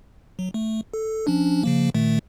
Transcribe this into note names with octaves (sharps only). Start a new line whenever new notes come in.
F#3
A3
A4
F3 C#4 D4
C#3 F3 A#3
A#2 D#3 A3